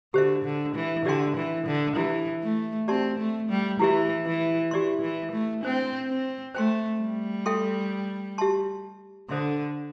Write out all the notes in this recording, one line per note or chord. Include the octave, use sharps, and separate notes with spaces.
D3 G4 C5 E5
D3
E3
D3 G4 D5 G5 C6
E3
D3
E3 E4 G4 E5
A3
C4 G4 D5 A5 C6
A3
G3
E3 E4 G4 E5
E3
E3 G4 D5 C6
E3
A3
C4 D4 C5 G5
C4
A3 C5 G5 C6
G3
A4 E5 G5 C6
G4 E5 A5 C6
D3 A4 C5 E5 C6